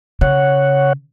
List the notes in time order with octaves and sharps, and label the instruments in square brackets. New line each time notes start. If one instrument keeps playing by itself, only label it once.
[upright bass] C#3 [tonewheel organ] C#5 F#5